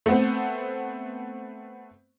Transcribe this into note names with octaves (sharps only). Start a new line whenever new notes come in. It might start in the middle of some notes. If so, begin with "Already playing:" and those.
A3 B3 C4